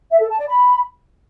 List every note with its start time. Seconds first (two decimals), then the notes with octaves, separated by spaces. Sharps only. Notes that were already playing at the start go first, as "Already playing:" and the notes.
0.10 E5
0.20 A4
0.29 A5
0.38 D5
0.47 B5